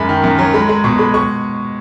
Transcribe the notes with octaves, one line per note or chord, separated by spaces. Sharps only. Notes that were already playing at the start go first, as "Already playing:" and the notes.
Already playing: F#2 G#3 B5
D#3
F#2
F#3
G#3 B5
G#3
B2 C#6
G#3 B5
G#3 C#6